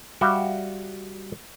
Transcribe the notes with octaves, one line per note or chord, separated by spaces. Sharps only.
G3 F#4 E5 F5 G5